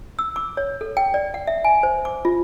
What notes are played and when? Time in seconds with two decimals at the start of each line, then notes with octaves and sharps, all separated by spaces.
0.19 E6
0.36 D6
0.57 C#5
0.81 A4
0.97 G5
1.14 D5
1.34 F#5
1.47 E5
1.64 G#5
1.83 C5
2.05 D6
2.25 F4